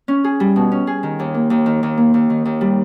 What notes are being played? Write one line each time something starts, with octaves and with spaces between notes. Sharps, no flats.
C#4
G#4
G3
B2
C#4
G#4
D#3
D#2
A#3
D#2
D#3
D#2
A#3
D#2
D#3
D#2
G3